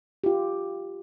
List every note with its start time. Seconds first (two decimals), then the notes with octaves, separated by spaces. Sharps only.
0.24 F4 G4